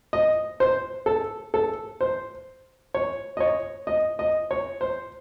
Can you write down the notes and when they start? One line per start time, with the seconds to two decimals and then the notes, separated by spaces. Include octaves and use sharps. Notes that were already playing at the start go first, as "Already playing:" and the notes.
0.13 D#5
0.60 C5
1.06 A4
1.54 A4
2.01 C5
2.94 C#5
3.37 D#5
3.40 C#5
3.87 D#5
4.19 D#5
4.51 C#5
4.81 C5